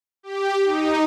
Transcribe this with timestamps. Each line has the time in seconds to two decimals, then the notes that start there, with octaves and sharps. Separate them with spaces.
0.23 G4
0.65 D#4